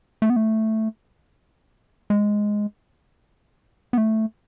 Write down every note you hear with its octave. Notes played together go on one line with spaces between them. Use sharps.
A3
B3
A3
G#3
B3
A3